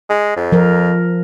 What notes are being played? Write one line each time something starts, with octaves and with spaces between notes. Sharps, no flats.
G#3
F2
F3 A#4